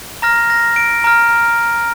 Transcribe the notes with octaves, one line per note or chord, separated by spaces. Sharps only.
A#5 F6 A#6
A#6
D7
A#5 F6